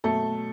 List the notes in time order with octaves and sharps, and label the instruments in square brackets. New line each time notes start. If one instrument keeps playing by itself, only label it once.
[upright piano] B2 F#3 A3 A4